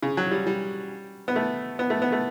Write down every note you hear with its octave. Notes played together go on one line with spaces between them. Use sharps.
C#3
F#3
G3
G3
B3
A3
B3
A3
B3
A3